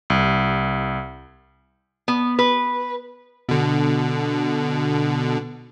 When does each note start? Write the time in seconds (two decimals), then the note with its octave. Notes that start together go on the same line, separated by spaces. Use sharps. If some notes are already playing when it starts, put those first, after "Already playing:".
0.10 C2
2.08 B3
2.39 B4
3.49 B2 D3